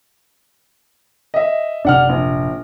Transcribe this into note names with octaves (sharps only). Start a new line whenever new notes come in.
D#5 E5
F#1 C3 D4 F#5 F6
A#1